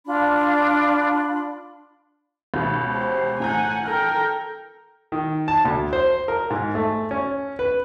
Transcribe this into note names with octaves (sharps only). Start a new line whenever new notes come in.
D4 F4 B5
C#2 B2
G4 C5
A2 F#5 G#5 A#5 G6
A4 A#4 G5 F6
D#3
A5
D2
C5
A#4
G#2
A3
C#4
B4